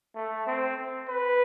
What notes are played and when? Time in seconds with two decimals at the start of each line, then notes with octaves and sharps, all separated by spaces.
0.15 A3
0.47 C4
1.08 B4